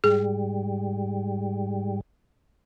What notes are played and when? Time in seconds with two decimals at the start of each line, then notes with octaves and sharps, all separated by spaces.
0.04 G#2 G3 G#4